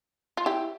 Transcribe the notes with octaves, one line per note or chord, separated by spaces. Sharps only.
F4
E4 G4